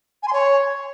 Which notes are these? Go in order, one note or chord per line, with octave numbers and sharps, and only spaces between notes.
G#5
C6
C#5